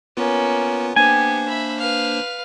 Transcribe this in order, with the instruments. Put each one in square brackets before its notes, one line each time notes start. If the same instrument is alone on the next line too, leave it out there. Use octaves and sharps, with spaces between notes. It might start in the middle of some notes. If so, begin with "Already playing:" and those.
[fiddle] A#3 C#4 [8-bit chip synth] B3 F4 B4
[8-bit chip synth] A#3 D4 C5 [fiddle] B3 G4 [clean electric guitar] G#5
[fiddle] E5 B5
B4 F5